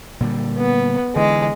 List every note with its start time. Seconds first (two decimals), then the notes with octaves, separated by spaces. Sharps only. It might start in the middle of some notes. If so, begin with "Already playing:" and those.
0.20 A#2 D3 G3
0.58 B3
1.16 D3 E3 G#3